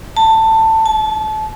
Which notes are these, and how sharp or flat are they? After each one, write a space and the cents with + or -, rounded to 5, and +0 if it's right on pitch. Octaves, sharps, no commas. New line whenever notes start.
A5 +15
A5 -30